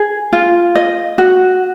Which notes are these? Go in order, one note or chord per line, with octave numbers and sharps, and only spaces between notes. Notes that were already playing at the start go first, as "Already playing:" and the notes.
Already playing: G#4
F4
D#5
F#4